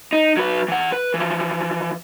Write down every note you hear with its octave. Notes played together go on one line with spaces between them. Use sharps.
D#4
F#3 B4
E3 F#5
B4
E3 F3